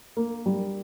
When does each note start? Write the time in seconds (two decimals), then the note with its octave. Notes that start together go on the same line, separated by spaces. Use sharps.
0.17 A#3
0.46 G3